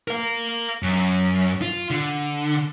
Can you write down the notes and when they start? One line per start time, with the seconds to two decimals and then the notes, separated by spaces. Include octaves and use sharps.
0.08 A#4 F5
0.82 F#2
1.62 F4
1.90 D3